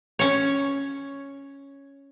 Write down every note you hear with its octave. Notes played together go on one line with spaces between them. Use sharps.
C#4 C#5